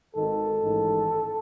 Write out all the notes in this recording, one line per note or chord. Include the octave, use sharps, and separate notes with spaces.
G#1 G#2 D#3 A4
A1 G#2 D#3